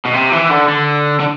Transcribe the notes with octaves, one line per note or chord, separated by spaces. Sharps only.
B2
C3
E3
D3
D3
D3